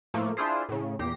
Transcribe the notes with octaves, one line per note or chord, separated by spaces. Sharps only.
A2 F3 A3 A#3
D4 E4 F4 G#4 C5
A2 C#3
E2 A#2 G4 A#6 C7